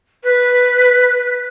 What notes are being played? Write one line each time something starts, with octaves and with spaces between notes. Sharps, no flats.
B4